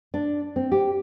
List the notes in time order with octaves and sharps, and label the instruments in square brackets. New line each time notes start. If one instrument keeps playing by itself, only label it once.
[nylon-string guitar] D4
C4
G4